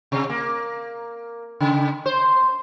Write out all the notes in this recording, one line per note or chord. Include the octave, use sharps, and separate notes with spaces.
C3
A#3
C#3
C5